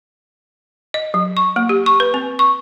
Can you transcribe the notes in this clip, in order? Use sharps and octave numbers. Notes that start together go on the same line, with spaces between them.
D#5
F#3
C#6
A#3
G4
C#6
B4
C4
C#6